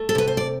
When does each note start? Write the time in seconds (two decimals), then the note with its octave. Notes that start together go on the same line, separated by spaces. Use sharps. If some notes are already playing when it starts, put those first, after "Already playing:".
Already playing: A3
0.09 A4
0.15 C3 B4
0.27 C5
0.37 D5